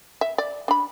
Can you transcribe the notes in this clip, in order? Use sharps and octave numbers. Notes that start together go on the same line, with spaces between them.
E5
D5
D4 B5